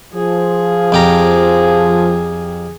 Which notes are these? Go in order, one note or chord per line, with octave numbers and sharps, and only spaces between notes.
F3 G#4
F2 G4 A#5